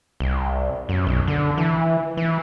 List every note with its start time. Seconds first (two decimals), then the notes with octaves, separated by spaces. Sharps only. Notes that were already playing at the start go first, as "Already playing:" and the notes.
0.20 C2
0.89 F#2
1.07 B1
1.28 D3
1.58 E3
2.17 E3